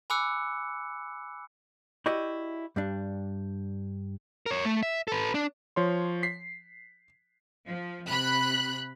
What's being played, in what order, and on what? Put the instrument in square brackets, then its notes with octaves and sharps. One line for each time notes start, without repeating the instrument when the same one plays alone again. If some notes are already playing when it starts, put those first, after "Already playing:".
[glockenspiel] G#5 B5 D6 E6 F#6 C#7
[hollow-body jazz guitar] E4 F#4 G4 D5 D#5
G2 G3 D4
[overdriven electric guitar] A#4 C#5
A3
E5
A4 B4
D4
[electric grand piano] F3 C#5 C6
B6 C7
[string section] F3
C3 B5 F#6